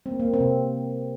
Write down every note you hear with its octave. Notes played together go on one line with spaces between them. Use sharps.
A#3 C4
A#3
C4
C3